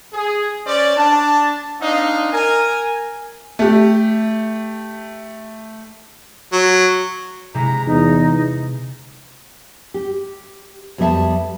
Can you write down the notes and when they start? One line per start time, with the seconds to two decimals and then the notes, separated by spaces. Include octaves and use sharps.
0.13 G#4
0.67 C#4 C5 D5
0.96 D4 A5
1.80 C4 D4 D#4 D#5 F5
2.32 A#4 G#5
3.59 A3 G4
6.53 F#3
7.54 C3 G#3 E4 A#5
7.87 E2 D#4
9.94 G4
10.98 F2 G3 B3 G4 E5 A5